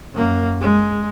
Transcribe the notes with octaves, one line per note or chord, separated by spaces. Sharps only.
F#2 A#3
G#3